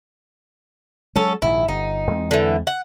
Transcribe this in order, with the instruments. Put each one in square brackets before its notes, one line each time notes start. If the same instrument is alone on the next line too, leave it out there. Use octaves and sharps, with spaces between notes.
[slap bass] F#3 G#3 [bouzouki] C#4 A4
[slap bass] A#1 G#2 D#3 [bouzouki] E4
[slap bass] G1 [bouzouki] D#4
[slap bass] E2 G#3 C4
[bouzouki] D3 E3
F#5